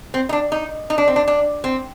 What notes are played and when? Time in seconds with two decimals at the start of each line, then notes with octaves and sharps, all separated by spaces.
0.14 C4
0.29 D#4
0.33 D4
0.52 D#4
0.90 D#4
0.98 D4
1.08 C4
1.16 D4
1.28 D4
1.64 C4